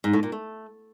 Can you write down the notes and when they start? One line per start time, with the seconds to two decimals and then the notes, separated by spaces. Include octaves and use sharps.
0.04 G#2
0.13 A2
0.23 A#2
0.32 A3